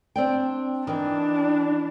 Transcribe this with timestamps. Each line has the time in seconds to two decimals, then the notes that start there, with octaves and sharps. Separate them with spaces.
0.16 C4 D4 G5
0.87 D#3 E3 D4